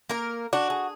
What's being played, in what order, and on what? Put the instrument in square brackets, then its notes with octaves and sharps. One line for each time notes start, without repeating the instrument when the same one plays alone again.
[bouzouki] A#3 A#4
[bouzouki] D4 [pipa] F#4
[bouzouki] G#4